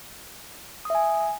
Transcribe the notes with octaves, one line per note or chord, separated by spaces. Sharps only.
E5 G#5 D#6